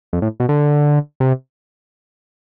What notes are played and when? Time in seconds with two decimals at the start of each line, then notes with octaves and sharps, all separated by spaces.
0.13 F2
0.22 A2
0.40 B2
0.49 D3
1.20 C3